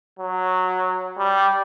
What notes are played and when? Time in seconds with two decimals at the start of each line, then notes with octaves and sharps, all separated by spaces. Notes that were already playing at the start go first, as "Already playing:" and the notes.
0.19 F#3
1.18 G3